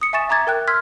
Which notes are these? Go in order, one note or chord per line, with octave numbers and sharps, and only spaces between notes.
D#6 C#7
E5 G#5 C#6 A6 E7
E5 A#5 D6 G#6 A6
A#4 G5 F#6
C6 E6 F6 G#6 B6